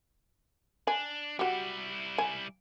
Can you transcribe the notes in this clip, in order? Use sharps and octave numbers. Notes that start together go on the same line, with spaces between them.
D4 G#5
G3 E4 F#4 G4
G#5